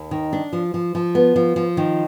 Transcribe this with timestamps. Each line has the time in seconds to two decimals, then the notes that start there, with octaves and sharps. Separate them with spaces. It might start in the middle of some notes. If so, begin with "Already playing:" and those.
Already playing: D#2
0.11 D#3
0.33 D4
0.53 F3
0.74 F3
0.95 F3
1.15 B3
1.36 F3
1.56 F3
1.77 D#3